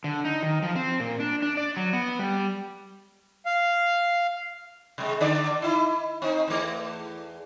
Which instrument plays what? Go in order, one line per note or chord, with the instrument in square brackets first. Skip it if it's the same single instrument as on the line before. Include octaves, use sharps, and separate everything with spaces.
[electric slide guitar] D3
D#4
D#3
F3
C4
A#2
D4
D4
D5
F#3
B3
G3
[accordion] F5
[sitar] C3 G#3
D3 D4 D5
D#4 E4
C4 D#4
E2 A3